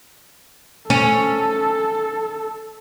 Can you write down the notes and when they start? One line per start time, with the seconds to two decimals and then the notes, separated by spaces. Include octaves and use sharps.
0.90 C#4 A4